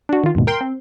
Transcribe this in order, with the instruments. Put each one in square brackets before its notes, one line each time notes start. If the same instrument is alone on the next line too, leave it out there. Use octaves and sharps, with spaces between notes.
[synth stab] D4 F#4
D#3 F4
D#2 G#2 B2
A#4 G5 C6
C4